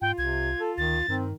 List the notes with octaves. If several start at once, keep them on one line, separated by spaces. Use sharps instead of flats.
G#2 F4 G5
C2 C3 G#6
A4
D2 D#3 A6
G2 D#3 C4